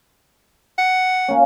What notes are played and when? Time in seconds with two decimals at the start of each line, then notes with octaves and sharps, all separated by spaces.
0.78 F#5
1.28 A#3 C#4